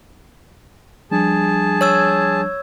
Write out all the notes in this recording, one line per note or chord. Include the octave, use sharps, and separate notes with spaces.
F3 G3 D4 G#4 A5
C#5 E6 G#6